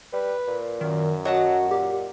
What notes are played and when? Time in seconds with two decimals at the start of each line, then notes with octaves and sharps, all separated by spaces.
0.13 G3 B4
0.47 A#2
0.81 F#2 D#3
1.25 F#3 F#4 D#5 F#5 A5
1.71 A#2 G4